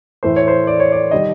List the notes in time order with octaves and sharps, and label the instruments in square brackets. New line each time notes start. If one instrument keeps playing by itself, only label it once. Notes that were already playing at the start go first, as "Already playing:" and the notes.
[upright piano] A2 E3 A3 C5
C#5
C5
D5
C#5
D5
D#3 G3 D#5